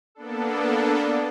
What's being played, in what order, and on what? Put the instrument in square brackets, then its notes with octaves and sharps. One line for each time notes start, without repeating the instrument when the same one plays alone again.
[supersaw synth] A#3 B3 D4 A4